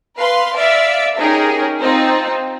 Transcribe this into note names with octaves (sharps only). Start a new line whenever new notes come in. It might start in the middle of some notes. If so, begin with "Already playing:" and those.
B4 F5 C6
D5 E5 F5
C#4 D#4 G4 G#4 A#4
C4 D#4 F4